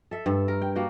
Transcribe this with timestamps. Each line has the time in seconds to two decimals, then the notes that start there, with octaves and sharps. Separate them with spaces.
0.11 A4 E5
0.26 G2
0.48 A#4
0.62 G5
0.75 A#3 D4 F#4 G5